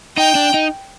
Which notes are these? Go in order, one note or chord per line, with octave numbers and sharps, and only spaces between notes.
D#4 G5
D4
D#4